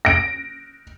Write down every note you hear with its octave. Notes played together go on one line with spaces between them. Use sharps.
A#6 D7